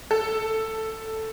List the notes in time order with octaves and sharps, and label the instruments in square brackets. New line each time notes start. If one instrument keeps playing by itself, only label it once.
[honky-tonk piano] A4